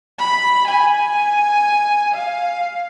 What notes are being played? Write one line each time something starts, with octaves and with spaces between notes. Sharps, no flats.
B5
G#5
F5